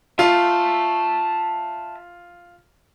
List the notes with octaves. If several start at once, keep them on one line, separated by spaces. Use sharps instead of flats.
F4 E5 A5